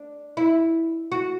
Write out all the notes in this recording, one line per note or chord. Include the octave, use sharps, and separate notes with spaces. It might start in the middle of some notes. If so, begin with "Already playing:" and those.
Already playing: D4
E4
F#4